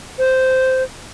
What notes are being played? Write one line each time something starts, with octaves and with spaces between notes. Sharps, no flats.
C5